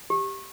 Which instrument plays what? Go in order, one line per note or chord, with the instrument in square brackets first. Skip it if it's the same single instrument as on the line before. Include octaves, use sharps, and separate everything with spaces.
[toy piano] G4